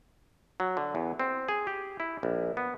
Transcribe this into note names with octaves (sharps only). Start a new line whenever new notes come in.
F#3
D3
E2
C4
G#4
G4
E4
A#1
B3